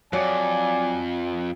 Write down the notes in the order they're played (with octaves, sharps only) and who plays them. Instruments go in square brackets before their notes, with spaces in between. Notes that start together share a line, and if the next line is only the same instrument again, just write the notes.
[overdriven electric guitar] F2 [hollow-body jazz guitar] F#3 [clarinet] D5 [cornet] G#5